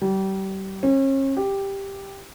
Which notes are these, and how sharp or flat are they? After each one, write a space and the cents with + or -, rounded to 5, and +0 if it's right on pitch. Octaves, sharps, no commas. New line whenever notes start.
G3 -30
C#4 -40
G4 +5